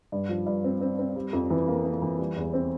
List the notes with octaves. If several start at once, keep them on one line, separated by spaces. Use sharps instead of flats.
G2
F3
G2
C4
C4
C4
G3
F2
E3
A#3
A#3
E3
G3
E2
C4